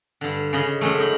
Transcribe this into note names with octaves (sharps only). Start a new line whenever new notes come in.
G2 D3
C#3 D#5 B5
F#2 G#3 A3
D#4 B5